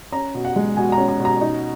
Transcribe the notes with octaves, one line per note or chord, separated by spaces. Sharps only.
C#4 A#5
B2
F#5
G#3
B2 G#5
A#5
C#4
A#5
B2
A#5
D#4